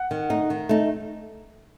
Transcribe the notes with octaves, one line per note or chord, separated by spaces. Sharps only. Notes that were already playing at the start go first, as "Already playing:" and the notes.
Already playing: F#5
D#3
A3 D#4
D#3
A3 D#4